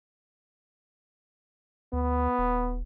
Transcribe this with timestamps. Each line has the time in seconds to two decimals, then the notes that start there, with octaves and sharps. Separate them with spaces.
1.93 D2 B3
2.39 D#1